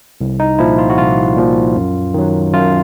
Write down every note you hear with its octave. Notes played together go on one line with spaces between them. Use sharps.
C2
D#4
A#2 F3 E4
F4
F#4
C2 F4
A#2 F3
F#2
D#3 F#3
F#2 F4